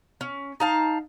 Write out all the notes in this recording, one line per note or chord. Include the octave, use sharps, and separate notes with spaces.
C#4
D#4 F5 A5